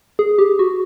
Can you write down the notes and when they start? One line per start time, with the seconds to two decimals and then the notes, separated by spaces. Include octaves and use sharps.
0.19 G#4
0.39 G4
0.59 F#4